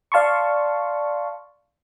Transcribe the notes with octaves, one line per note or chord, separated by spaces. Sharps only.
D5 F5 A5 C6 C#6